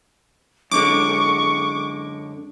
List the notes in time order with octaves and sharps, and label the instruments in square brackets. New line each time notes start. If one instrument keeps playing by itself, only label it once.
[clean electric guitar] F#2 D3 G#3 [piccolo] C#6 [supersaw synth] D6